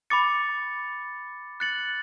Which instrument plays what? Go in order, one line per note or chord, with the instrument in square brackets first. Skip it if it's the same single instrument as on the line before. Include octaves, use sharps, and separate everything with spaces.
[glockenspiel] B5 D6 A6 C#7
F#6 A6 C#7 F#7